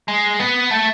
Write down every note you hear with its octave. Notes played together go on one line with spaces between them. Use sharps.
G#3
B3
A3